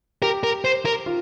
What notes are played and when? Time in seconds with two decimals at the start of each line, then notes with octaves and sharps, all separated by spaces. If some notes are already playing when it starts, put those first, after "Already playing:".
0.22 G4 A#4
0.44 A#4
0.65 C5
0.85 A#4
1.06 F4